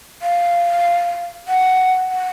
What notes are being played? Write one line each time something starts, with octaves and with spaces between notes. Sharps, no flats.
F5
F#5
F#5